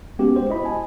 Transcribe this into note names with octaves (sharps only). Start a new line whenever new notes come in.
G#3 B3 C#4 F#4 G4
C5
E4 D#5 B5
G#5 A5